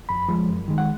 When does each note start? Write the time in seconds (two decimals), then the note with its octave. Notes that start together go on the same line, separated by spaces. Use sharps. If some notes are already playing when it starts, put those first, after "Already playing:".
0.09 F2 B5
0.29 F3 G#3
0.49 F#2
0.68 D#3 G#3
0.78 F#5